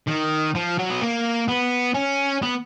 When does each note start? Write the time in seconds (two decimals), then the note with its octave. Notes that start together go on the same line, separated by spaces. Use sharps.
0.07 D#3
0.55 F3
0.78 F#3
0.90 B3
1.01 A#3
1.48 B3
1.94 C#4
2.42 B3